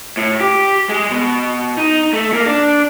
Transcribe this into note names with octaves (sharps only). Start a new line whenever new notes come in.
A2
G4
G#3
B2
D#4
A3
A#3
D4